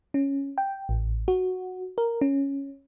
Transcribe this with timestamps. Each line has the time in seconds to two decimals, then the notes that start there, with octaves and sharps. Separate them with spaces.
0.14 C#4
0.58 G5
0.89 A1
1.28 F#4
1.98 A#4
2.21 C#4